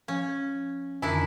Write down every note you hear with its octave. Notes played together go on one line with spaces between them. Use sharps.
F3 C#4
F2 D3 D#3 D4 E4